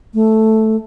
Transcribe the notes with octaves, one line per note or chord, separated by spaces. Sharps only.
A3